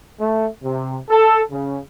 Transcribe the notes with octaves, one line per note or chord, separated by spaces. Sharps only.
A3
C3
A4
C#3